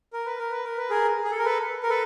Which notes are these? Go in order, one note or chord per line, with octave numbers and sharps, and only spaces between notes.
A#4
B4
A#4
B4
A#4
B4
G#4 A#4
G#4
A4
A#4
A4 B4
A#4
A4 B4